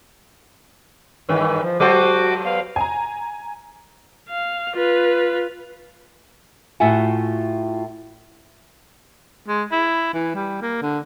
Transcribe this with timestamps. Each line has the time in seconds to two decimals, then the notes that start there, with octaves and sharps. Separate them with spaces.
1.29 G2 D#3 E3
1.63 F3
1.80 F#3 F#4 A4 C5 D6
2.45 B3 F5
2.76 G#5 A#5
4.29 F5
4.73 F4 B4
6.80 A2 F4 F#4 E5 F#5 G#5
9.48 G#3
9.71 E4
10.13 E3
10.35 G3
10.62 A#3
10.82 D3